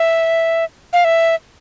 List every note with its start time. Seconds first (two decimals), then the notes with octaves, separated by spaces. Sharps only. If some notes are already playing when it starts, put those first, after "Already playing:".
Already playing: E5
0.93 F5
1.04 E5